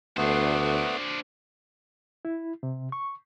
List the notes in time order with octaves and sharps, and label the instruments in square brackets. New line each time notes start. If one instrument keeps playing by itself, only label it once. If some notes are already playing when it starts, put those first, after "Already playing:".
[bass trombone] D2 [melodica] A3 B3 [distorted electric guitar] D4 C5
[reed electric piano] E4
C3
C#6